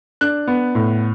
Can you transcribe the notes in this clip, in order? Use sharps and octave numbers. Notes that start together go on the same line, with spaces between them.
D4 F#6
B3
A2